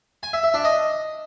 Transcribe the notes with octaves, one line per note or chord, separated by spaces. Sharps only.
G#5
E5
E5
D4
D#5